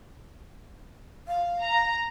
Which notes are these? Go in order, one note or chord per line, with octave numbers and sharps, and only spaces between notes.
F5
A#5